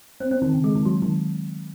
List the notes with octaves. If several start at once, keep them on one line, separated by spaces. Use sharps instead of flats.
C4
C4
D#3
C#3
G#3
D#3
F#3
D#3